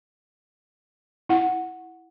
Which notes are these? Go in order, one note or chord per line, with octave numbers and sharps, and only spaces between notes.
E4 F#5